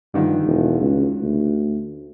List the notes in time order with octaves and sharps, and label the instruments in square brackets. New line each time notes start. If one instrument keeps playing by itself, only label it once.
[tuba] G2 [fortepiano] D3 D#3 F3
[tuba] E1
C#2
D2